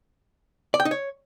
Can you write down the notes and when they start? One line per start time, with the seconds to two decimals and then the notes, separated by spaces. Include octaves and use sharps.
0.74 D5
0.80 G5
0.85 D#4
0.91 C#5